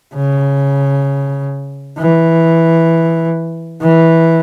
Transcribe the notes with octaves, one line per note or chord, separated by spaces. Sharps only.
C#3
E3
E3